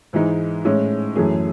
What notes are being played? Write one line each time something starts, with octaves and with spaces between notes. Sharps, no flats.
G#2 E3 G#3 D#4
A2 G#3 C#4
F#2 E3 A3 C#4 G#4